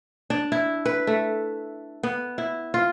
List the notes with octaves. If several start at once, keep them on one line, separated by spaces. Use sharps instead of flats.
D4
E4
B4
A3
B3
E4
F4